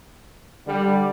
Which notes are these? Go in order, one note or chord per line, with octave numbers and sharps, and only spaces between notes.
D3 G3